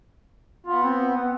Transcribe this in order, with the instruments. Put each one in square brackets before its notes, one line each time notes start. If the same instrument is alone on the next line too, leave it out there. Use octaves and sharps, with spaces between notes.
[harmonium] B3 [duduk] F4
[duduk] C4
B3